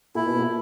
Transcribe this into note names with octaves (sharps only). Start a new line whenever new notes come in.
A#2 E4
B2
A#2